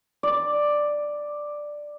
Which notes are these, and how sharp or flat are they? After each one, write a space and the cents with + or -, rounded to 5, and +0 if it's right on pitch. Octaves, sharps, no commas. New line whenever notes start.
D5 +5